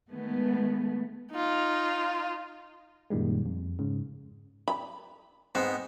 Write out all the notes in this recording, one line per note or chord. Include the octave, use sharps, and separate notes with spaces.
D#3 G#3 A3 B3
D#4 F4
F#2 A#2 D#3 G3 G#3
F2
G#2 C#3
B5
G#2 B3 C4